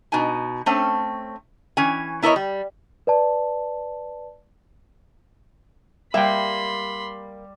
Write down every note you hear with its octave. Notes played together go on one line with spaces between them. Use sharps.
B2 D#4 G#5
A3 C4 C#4
E3 C#4 G#5
B3 E4 A#4 C5 C#5 D#5
G3
B4 D5 A5
G3 A#3 E5 G5 B5 C6